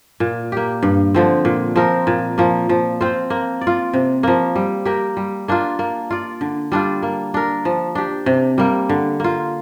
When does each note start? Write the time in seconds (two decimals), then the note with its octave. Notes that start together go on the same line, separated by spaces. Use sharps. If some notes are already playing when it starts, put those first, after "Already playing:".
0.20 A#2
0.52 A#3 G4
0.83 G2
1.14 D3 F3 C4
1.45 A#2
1.76 F3 C4 A#4
2.07 A#2
2.38 F3 A#3
2.69 F3
3.01 C4 F4 C5
3.30 A#3
3.61 D5
3.67 F4
3.93 C3
4.23 F3 A#3
4.56 G3
4.85 A#3 G4 A#4
5.17 G3
5.48 A#3 D4 F4
5.79 A#3
6.11 F4 D5
6.41 D3
6.72 G3 D4 F4
7.03 A#3
7.34 D4 A#4
7.65 F3
7.95 D4 G4
8.26 C3
8.58 G3 A#3
8.89 D3
9.20 A#3 F4